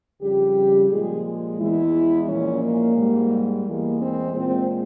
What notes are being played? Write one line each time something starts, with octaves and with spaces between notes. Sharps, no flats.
F2 C#3 G3 G4
A#2 F3 G#3 G#4
E2 E3 G#3 E4
A#2 F3 G#3 C#4
A#3
G#2 G3
E2 E3 G#3 A#3
C4
A#2 G#3 C4